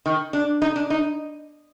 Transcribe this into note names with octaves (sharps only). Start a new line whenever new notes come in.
D#3
D4
D#4
D4
D#4